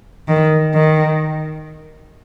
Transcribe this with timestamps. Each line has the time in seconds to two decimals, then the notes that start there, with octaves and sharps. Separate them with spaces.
0.28 D#3
0.74 D#3